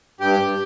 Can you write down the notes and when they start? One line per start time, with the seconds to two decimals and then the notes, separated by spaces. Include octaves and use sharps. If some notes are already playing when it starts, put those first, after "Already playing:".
0.21 G2 G4
0.40 G2